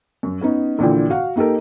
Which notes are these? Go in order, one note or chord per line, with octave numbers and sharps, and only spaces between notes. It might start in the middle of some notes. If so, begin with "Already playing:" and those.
F#2
B3 C#4 D#4
A#1 A#2 D3 E3 F4 G5
F#4 F5 F#5
A#3 D#4 G4 A4 A#4